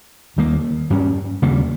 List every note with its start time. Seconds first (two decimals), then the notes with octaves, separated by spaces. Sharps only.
0.37 D#2 D#3 G3 A#3
0.90 G2 G3 C#4
1.42 D#2 C#3 G3 A#3